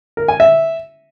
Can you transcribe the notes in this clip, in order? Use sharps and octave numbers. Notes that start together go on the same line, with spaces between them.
A#4
G#5
E5